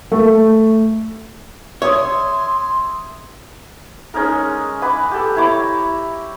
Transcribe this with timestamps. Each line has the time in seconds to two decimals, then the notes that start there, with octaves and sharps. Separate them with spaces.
0.12 A3
1.82 C#5 E5 C6 D#6 G#6
4.14 G#3 C#4 D#4 A#4
4.82 B4 G#5 D6
5.11 G4 A4
5.36 E4 C#5 A#5 D6